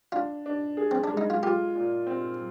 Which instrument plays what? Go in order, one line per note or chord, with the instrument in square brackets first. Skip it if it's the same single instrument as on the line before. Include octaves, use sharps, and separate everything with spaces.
[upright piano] D4 [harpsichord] F4
[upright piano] D4
G#4
[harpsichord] C4
D4
[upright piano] G#3
[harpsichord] D#4
F4
[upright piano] F4 [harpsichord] G4
[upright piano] A#2
C4